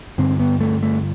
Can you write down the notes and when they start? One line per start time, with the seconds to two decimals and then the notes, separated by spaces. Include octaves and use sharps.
0.18 G2 D3 C4
0.40 B3
0.61 A3
0.83 A3